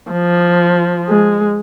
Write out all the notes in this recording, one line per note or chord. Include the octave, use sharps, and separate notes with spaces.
F3
G#3